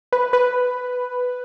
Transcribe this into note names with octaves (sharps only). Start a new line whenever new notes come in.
B4
B4